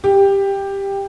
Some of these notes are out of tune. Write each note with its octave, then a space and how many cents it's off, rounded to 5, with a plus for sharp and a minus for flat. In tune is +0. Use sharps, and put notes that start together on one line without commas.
G4 +10